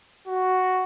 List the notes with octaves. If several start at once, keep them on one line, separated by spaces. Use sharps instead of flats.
F#4